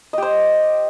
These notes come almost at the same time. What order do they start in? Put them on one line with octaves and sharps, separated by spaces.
D#5 G4 C5